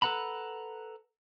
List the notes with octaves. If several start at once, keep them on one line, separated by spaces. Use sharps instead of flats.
A4 B4 F#5 A#5 B5